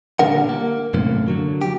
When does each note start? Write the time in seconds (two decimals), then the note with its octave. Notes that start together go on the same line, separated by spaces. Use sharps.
0.19 A#2 D3 G3 D4 A#4 F#5
0.49 A#3
0.94 F#2 A2 C3 A#3
1.28 D3 F#3
1.61 G4